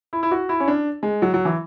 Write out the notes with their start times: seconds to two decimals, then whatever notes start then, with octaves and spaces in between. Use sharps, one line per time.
0.13 E4
0.23 E4
0.31 F#4
0.49 E4
0.60 C#4
0.68 D4
1.03 G#3
1.22 F#3
1.34 F#3
1.45 E3